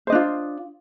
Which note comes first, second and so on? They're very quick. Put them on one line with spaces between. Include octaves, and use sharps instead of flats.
C5 D#5 D4 F4